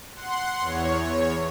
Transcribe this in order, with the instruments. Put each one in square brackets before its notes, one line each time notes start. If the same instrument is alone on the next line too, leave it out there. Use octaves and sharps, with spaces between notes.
[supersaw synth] F#5 C6
E2 C#5